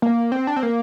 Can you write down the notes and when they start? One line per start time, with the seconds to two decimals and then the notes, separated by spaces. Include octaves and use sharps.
0.02 A#3
0.32 C4
0.47 D4
0.56 C4
0.63 A#3